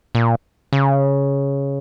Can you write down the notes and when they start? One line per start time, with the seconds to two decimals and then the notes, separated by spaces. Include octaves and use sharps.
0.15 A#2
0.73 C#3